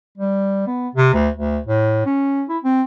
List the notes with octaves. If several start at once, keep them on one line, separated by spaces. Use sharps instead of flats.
G3
B3
C3
D2
D2
A2
C#4
E4
C4